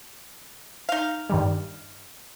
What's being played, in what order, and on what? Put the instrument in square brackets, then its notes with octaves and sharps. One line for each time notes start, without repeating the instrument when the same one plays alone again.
[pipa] D#4 F5
[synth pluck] G2 D#3 G3